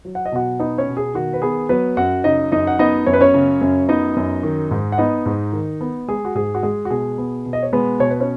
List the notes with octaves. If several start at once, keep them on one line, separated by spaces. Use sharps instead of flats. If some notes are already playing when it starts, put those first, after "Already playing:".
F#3
F#5
D#5
B2 F#4 F#5
B3 D#4 D#5
C#4 C#5
B2
G#4
D#3 F#4
B4
B3 G#4
F#3 B3 B4
F#2 F#4 F#5
C#3 D#4 D#5
F#2 D#4 D#5
F#5
B3 D#4 D#5
F#2 C#5
B4
C#4 C#5
C#3
F#2
B3 D#4 D#5
F#2
D#3
G#2
F#5
B3 D#4 D#5
G#2
D#3
B3
G#3 G#4
F#4
G#2 G#4
F#4
G#3 G#4
F#4
B2 G#4
B3
B2
D#5
C#5
G#3 B3 B4
B2 C#5
B4
C#4 C#5